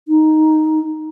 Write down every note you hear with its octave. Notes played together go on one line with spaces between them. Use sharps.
D#4